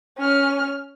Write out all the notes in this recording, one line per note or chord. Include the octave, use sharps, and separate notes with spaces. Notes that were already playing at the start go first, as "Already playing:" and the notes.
C#4 F6